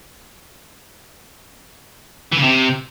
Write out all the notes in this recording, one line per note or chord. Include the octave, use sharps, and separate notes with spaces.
E3
C#3
C3